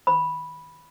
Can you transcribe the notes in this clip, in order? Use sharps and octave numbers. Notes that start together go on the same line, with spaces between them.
B5